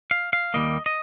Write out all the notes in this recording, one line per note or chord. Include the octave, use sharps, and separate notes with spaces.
F5
F5
D#2 D#3 G3 A#3 D#5
D#5